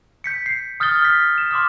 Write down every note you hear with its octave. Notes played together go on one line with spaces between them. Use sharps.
G6 B6 C#7
C7
D#6 F6 G6 A6 G7
F6 B6
E7
C6 D6 D#6 F6